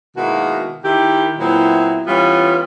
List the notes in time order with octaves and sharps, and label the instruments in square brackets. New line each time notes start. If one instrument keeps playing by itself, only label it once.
[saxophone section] B2 D#3 G#3 A#3 E4 F#4
D#3 E4 G4
A#2 F#3 B3 C4 E4
E3 G3 B3 C#4 F4